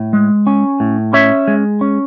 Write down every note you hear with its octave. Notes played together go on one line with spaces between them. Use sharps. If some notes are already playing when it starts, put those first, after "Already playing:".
Already playing: A2
G#3
C#4
A2
C#4 C#5 E5
G#3
C#4